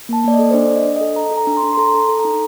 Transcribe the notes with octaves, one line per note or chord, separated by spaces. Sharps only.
A#3 A5
A#3 D5
D#5
A4
C5
D4 D5
D4
D#5
D4
D#5
A4
A4 A#5
A4
A#5
D4
C6
D4
C6
A4 A#5
A4
A4
A#5
D#4